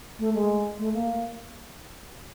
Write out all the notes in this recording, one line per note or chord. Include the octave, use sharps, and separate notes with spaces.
A3
G#3
A3
A#3